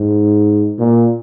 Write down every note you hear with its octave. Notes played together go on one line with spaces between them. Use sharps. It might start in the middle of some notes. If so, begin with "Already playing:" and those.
Already playing: G#2
A#2